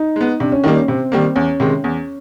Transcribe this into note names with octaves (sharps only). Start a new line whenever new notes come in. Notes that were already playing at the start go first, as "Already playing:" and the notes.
Already playing: D#4
G#3 B3
C3 D4
C#4
D#3 G3 A#3 D#4
C#4
C3 C4
D#3 G3 A#3
E2 C#4
C3 D#3 G#3
E2